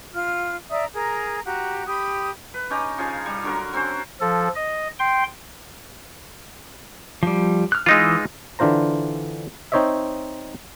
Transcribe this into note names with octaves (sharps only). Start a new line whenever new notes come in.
F4 F6
D5 E5 A#5 D#6
G#4 A#4 A#5
F#4 G4 A#5
G4 B5 D#6
B4
C#4 D#4 G4 A#5
C#3 F3 F4 G#4
G3
D3 F#3 A#4
F#3 C4 C#4 C5
F3 A4
D#5
G5 C6
F3 G3
F6 F#6
E3 G#3 D#4 F4 E6
D3 E3 D4 F4 C5 A#5
C4 D#4 C5 C#5 D#5 E5